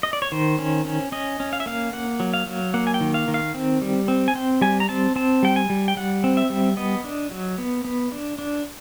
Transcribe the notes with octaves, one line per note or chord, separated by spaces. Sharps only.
D#5
D5
C#5
D#3 C5
C#4
C#4
C#4 D#5
C#4
F5
E5
A#3 F5
A#3 F#5
F#3
F5
F#3
A#3 F#5
G#5
G5
D#3
F5
D#3
F5
C4
G3
C4
G#5
C4 G5
G3 G#5
A#5
C4 A5
C4 A5
G3 G5
G#5
G3
G5
G3 F#5
C4
E5
G3
B3 D#5
D4
F#3
B3
B3
D4
D4